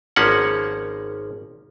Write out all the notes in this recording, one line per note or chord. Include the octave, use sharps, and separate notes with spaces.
G#1 F3 A#3 C#4 F#5